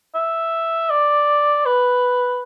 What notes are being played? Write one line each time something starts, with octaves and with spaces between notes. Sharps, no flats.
E5
D5
B4